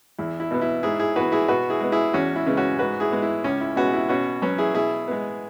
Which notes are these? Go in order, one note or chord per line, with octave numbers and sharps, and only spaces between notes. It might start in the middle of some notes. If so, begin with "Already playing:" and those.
E2 E4
E4
B2 B3
E4
G#2 E4 G#4
E4 G#4
E3 B3 F#4 B4
E4 G#4
B2 F#4 B4
E4 G#4
G#3 B3
E4 G#4
E2 C#4 F#4
E4
C#3 G#3 B3
C#4 F#4
G#2 F#4 B4
E4 G#4
G#3 B3
E4
C#2 C#4
E4
B2 G#3 B3 C#4 F#4
E4
B2 C#4 F#4
F#3 B3 C#4
E4 G#4
B2 E4 G#4
G#3 B3